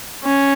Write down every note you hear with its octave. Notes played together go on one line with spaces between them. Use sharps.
C#4